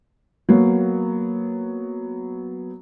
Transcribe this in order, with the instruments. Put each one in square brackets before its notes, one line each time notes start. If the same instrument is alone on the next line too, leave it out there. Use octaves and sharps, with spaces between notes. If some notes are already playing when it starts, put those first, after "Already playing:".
[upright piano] F#3 B3 [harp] A#3